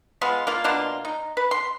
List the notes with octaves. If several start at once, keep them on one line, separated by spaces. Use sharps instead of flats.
G#3 B3 F4
A#3 F4
B2 A#3 D4 F4
D#4
B4
C6